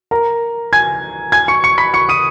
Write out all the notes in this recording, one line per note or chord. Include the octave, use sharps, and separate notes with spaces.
A#4 A#5
G#5 G#6
G#5 G#6
C#6 C#7
C#6 C#7
B5 B6
C#6 C#7
D#6 D#7